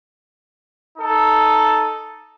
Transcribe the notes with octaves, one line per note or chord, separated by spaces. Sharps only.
D#4 A4